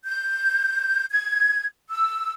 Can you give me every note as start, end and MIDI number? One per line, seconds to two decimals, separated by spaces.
0.06 1.04 91
1.10 1.65 92
1.90 2.32 88